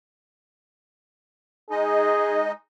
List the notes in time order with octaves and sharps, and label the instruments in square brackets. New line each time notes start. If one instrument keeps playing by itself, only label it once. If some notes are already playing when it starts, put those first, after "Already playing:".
[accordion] G#3 D#4 D#5 [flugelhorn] G#4